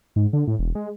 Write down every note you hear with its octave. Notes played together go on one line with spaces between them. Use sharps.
G#2
D3
A2
E1
G#3